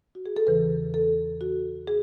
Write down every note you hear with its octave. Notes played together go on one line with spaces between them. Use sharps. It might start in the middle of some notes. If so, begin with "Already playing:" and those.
F#4
G#4
A4
E2 C#3 E3 B4
A4
F#4
G#4